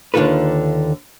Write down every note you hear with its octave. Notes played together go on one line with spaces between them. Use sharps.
D#2 D3 D#3 F4 A4 B4